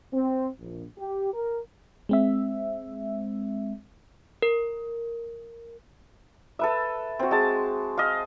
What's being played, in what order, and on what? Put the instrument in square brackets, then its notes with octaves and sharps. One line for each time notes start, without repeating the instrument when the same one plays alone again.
[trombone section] C4
A#1
G4
A#4
[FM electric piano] G#3 C4 E5
[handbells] A#4
[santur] A4 B4 E5
C4 F#4
G#3 A5
D#5 F5